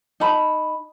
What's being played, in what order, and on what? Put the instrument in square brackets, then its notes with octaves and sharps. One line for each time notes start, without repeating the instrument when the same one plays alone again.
[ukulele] D#4 A5 B5